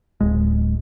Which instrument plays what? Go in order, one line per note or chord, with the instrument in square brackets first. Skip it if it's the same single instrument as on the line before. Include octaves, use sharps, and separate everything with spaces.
[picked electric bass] D1 G#3